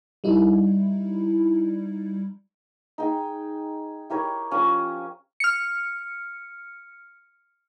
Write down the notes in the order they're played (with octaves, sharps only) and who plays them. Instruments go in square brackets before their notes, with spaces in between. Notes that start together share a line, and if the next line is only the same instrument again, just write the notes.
[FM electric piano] G3 D#4 E4
[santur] D#4 G#4 G5
E4 G4 A#4 C#5
F3 C#4 C#6 D#6
[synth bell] F6 C#7